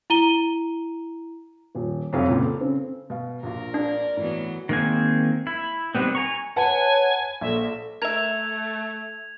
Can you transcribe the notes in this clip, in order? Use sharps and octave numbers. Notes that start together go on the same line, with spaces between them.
E4 A#5 D#7 G7
D#1
C2 F2 A4 C#5 F5
C#2 A#2
A4
C#3 C4
B2 F5
A#1 F4 A#4
D4 D5
A2 E3 F#3 B3
D#3 G#3 A#3 C4 G#5
E4
D#3 F3 G3 B3 C4
G#5 A#5 C#6
B4 C#5 F#5 G#5 A5
A#1 A4 E5
A3 A#4 E5 G#6 F7